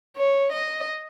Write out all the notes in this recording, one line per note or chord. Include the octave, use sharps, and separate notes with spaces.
C#5
D#5